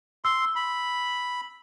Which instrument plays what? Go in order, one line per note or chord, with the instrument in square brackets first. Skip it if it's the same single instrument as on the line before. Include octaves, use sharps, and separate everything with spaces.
[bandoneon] C6 [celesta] E6
[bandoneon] B5